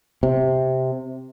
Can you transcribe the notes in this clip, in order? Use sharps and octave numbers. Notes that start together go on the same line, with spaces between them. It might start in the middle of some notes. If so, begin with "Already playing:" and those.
C3